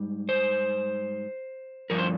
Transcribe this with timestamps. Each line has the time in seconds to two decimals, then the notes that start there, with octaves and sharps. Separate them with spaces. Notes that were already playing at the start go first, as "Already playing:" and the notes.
Already playing: G#2 G3
0.29 C5
1.90 G2 F3 A#4
1.98 C5